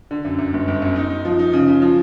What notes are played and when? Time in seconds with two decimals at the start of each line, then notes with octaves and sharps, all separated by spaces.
0.11 D3
0.25 F#2
0.39 F#2
0.53 G1
0.68 G1
0.82 F#2
0.96 D#4
1.10 D#4
1.25 F3
1.39 D#4
1.53 C#3
1.68 C#3
1.82 F3